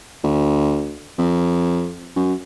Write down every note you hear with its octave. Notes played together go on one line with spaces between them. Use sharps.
D2
F2
F#2